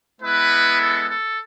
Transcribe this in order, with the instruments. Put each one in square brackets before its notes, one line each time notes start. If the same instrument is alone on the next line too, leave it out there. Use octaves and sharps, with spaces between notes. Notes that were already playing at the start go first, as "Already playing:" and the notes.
[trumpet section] G#3 B3 E4 B4
A4
A4